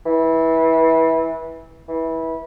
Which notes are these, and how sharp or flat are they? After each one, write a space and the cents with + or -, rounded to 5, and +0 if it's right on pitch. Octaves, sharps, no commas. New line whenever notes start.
E3 -20
E3 -20